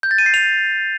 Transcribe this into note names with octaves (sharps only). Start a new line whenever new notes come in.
G6
A6
D#7
C7
F7